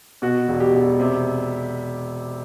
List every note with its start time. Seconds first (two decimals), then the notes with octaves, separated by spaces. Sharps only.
0.22 B2 F#4
0.48 E1
0.60 G4
0.74 E1
1.00 C3